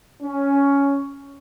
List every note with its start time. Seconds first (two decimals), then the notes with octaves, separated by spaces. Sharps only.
0.23 C#4